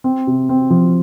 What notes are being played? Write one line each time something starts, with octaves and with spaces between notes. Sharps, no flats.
C4
C3
C4
F3